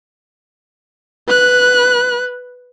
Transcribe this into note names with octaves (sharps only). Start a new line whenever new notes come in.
B4 F#6